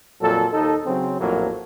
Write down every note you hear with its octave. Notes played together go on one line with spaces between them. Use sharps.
F2 A#2 F#3 A4
D#2 D#4 A4
C#3 F#3 C4
A#1 F2 A2 F#3 A#3